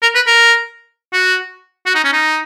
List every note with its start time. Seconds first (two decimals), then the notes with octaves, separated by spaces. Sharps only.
0.03 A#4
0.15 B4
0.27 A#4
1.13 F#4
1.86 F#4
1.95 D#4
2.05 C#4
2.13 D#4